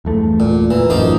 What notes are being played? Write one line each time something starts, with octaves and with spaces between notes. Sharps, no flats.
G1 E2 A3
A#2
A#2 E3
A1 F#2 F3 A#3 D#4